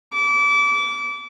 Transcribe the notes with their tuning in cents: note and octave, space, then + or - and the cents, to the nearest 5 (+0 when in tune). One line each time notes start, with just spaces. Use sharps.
D6 -30